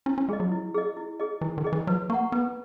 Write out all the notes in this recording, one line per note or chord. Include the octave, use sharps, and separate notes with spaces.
C#4 E4
C#4
G#3 G#4 D#5
F#3
E4
G#4 D#5
E4
G#4 D#5
E3 E4
D#3
G#4 D#5
E3
F#3 B4
A#3 F#5 A#5 C#6
B3 B4